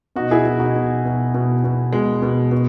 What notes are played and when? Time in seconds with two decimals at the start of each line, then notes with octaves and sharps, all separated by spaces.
0.16 B2 D#4 F#4
0.31 E4 G#4
0.45 B2
0.60 D#4 F#4
0.75 B2
1.05 B2
1.34 B2
1.64 B2
1.93 B2 G#3
2.22 B2
2.52 B2